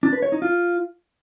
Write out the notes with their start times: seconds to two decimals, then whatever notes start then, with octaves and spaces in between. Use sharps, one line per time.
0.03 D4
0.13 B4
0.22 C#5
0.32 D#4
0.42 F4